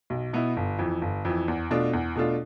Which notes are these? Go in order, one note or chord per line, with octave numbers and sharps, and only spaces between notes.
B1
B2 B3 E4
G1
F2 E3
G1
F2 E3
E2
B2 A3 D4 F4
E2
B2 A3 D4 F4